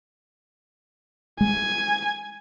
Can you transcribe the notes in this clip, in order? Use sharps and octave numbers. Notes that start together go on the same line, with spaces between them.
G#3 G#5